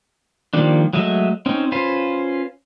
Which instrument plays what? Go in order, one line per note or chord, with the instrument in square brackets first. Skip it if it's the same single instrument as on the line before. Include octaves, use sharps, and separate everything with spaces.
[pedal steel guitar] D#3 F3 G3 A#3 D4
F#3 G#3 A3 D#5 E5
C4 C#4 D#4
C#4 F4 B4 C5